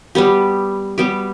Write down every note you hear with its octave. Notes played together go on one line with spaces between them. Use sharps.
G3 B3 G4
G3 B3 G4